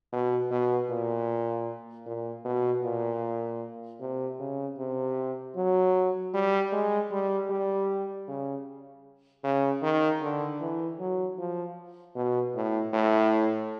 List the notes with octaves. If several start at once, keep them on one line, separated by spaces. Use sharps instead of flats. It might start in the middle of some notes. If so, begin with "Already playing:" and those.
B2
B2
A#2
A#2
B2
A#2
C3
C#3
C3
F#3
G3
G#3
G3
G3
C#3
C#3
D#3
D3
E3
F#3
F3
B2
A2
A2